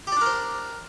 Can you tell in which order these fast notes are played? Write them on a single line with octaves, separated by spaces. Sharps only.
G4 D5 D4 A#4 C5